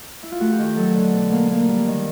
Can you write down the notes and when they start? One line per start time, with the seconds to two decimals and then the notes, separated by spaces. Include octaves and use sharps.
0.23 E4
0.32 F4
0.40 A3 F#4
0.52 G4
0.59 D#3
0.77 F#3 A4
0.95 D3
1.13 B2
1.32 A#3
1.50 A#3
1.69 G3
1.87 D#3